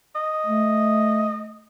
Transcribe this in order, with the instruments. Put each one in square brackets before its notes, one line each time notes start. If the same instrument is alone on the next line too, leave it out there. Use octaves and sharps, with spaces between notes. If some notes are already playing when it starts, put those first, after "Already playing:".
[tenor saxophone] D#5
[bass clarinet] A3